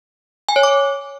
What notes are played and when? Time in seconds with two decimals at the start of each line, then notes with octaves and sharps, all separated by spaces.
0.49 G#5
0.56 C#5
0.63 D6